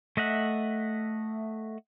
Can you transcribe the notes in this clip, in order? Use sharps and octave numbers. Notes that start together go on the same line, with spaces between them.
A3 D#5 E5 F#5